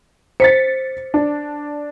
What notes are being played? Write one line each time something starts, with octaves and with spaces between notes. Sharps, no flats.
C5 A6 B6 C#7
D4